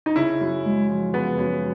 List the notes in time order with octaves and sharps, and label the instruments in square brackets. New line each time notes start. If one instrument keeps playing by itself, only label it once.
[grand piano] D#4
[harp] C#3 [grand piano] E4
[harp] F#2
G#3
F3
[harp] C#3 [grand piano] B3
[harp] F#2